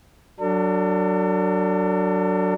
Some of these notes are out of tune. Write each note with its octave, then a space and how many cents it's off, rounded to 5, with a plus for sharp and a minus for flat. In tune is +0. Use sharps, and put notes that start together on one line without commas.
F#3 +10 D4 +0 A4 +45